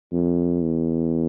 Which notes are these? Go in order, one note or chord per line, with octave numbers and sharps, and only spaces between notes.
F2
E2